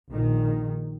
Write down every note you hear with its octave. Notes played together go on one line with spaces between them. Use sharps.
A#1 A#2 D#3